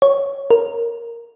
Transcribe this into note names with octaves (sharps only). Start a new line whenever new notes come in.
C#5
A#4